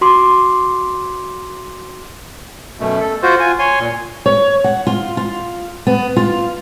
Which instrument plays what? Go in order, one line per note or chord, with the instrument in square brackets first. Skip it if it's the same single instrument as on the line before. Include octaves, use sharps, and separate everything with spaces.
[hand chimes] F#4 C6 D6
[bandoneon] F#2 B2 A3
A4
F4 F#4 C5
F4 G#5
C#5 G#5 C6
A#2
[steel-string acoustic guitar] C#5
F#5
F4
F4
B3
F4